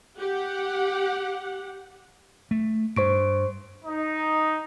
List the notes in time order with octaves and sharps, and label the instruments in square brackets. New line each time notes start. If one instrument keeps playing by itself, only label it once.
[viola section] G4 F#5
[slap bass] A3
[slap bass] G2 [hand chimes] C5 C#6 D7
[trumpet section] D#4